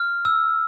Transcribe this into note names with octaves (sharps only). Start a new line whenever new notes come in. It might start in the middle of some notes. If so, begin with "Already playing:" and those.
Already playing: F6
E6